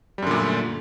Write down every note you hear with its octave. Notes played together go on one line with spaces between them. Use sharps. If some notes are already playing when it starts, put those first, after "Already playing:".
F#2 A#2 D3 G3 A3